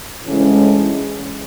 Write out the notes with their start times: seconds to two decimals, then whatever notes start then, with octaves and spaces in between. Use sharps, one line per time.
0.24 D2 C#3 E3 G#3 C#4